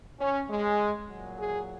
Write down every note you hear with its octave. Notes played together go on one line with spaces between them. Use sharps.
C#4
G#3
A#2 F#3
G#4